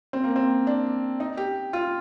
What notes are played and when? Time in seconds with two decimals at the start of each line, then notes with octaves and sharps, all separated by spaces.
0.13 C4
0.24 A#3
0.36 C4
0.67 D4
1.20 D#4
1.37 G4
1.73 F4